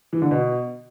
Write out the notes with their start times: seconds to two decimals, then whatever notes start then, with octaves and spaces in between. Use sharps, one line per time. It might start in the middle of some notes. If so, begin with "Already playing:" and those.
0.13 E3
0.22 D3
0.31 B2